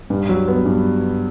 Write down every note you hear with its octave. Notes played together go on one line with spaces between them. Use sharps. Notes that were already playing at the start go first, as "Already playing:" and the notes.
G2
F#3
B3
G2